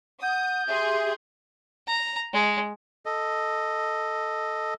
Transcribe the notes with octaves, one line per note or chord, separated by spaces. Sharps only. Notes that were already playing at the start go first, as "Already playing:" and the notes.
F#5 D#6 G6
G4 G#4 E5 C6
A#5
G#3
A4 D#5